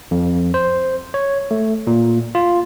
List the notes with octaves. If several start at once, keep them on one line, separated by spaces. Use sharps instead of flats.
F2
C5
C#5
A3
A#2
F4